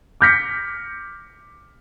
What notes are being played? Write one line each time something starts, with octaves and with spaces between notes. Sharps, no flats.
D6 F6 G6 A#6 B6 C#7